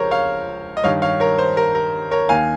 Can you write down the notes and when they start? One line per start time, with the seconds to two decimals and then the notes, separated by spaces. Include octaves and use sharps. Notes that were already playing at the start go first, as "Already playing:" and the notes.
Already playing: C#2 C#3 F3 A#4 C5 C#5
0.11 C#5 F5
0.77 D#5
0.84 G2 D#3 C#5 F5
1.02 C#5 F5
1.20 A#4 C#5
1.39 C5
1.57 A#4
1.75 A#4
2.11 A#4 C#5
2.29 D#2 D#3 F5 G#5